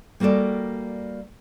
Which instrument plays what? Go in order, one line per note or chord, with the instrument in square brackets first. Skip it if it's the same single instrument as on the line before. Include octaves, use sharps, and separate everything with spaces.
[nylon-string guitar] G3 A#3 F#4 A4 D5